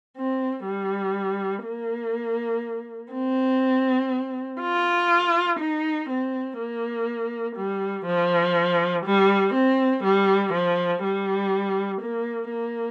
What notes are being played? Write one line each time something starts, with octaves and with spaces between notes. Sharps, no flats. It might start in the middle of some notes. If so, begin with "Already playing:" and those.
C4
G3
A#3
C4
F4
D#4
C4
A#3
G3
F3
G3
C4
G3
F3
G3
A#3
A#3